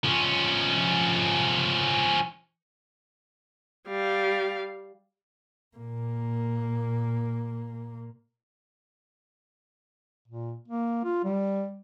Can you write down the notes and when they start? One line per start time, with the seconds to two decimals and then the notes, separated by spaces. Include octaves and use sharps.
0.04 F3 C#4
3.88 G3 F5
5.76 A#2 A#3
10.28 A#2
10.68 A#3
11.05 F4
11.24 G3